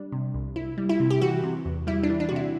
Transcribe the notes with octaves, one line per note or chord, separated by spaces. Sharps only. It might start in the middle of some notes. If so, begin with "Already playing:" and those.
Already playing: G3 D4
C3
C2
C2 E4
G3
E4
C3
G4
E3 F#4
C3
E2
G3 E4
D4
E3
D4
C3 F#4
E4